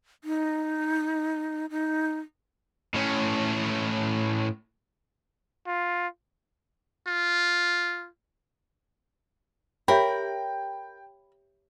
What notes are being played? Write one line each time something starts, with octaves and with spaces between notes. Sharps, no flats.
D#4
D#4
A2 C#4
F4
F4
G4 A#4 C#5 E5 G5 B5